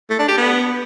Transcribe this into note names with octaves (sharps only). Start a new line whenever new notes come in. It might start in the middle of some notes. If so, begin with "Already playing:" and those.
A3
D4
G4
B3